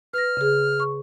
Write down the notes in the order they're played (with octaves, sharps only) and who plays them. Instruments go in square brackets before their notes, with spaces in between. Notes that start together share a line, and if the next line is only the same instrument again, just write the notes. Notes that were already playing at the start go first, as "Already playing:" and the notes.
[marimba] B4 A#6 [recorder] F6
[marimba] C#3 G#4
C#6